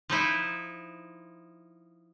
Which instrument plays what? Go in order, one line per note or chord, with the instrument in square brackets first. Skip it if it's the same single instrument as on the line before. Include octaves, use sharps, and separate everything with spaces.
[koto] F3 D#4 E4